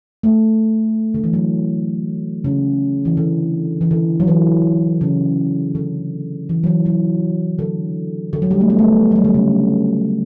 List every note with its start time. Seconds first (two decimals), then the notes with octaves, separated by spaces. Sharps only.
0.23 A3
1.14 D3
1.24 E3
1.33 F#3
2.44 C#3
3.05 E3
3.17 D3
3.81 E3
3.91 D3
4.20 F#3
4.27 E3
5.01 C#3
5.75 D3
6.49 E3
6.64 F#3
6.67 E3
6.86 F#3
7.59 D3
8.33 D3
8.42 F#3
8.51 G3
8.60 A3
8.70 B3
8.79 A3
9.12 G3
9.16 F#3
9.24 D3
9.34 C#3